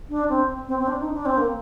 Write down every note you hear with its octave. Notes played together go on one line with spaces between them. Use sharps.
D4
C4
C4
C4
D4
D#4
D4
C4
A#3